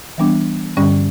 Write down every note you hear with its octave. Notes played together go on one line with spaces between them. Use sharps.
E3 G3 B3 D4
G2 D3 G3 C#4